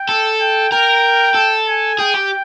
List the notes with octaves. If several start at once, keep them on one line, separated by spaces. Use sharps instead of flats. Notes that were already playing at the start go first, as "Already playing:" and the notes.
Already playing: G5
A4
G5
A#4 G5
A4
G#5
G#4 G5
G4